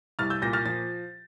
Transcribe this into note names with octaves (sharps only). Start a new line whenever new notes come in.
C2 F6 A6
E6 G6
A#2 G6 A#6
F6 A6
F3 A6